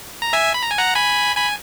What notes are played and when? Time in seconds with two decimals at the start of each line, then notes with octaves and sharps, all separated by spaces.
0.22 A#5
0.33 E5 G#5
0.54 B5
0.63 A#5
0.71 G#5
0.78 F#5 A#5
0.95 G#5 B5
1.36 G#5 B5